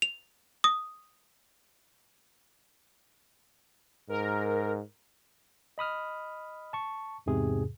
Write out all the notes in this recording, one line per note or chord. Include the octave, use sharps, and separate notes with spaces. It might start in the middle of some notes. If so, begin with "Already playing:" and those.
F7
D#6
G#2 A#4
D#5 B5 D#6 F6
A5 C#6
E2 G#2 C3 G#4